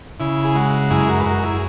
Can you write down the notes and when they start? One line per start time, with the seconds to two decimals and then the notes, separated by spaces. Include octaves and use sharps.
0.20 C#3 E4
0.44 G#4
0.55 G#3 F#4
0.90 F#2 E4 G#4
1.08 F#4 A#4
1.20 B4
1.25 F#2 F#4 A#4
1.43 E4 G#4